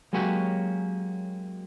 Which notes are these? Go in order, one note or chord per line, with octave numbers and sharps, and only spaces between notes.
F#3 G#3 A#3 C#4 F#4 G4